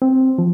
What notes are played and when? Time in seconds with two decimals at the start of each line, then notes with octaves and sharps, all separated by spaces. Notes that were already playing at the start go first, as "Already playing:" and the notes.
0.02 C4
0.38 F3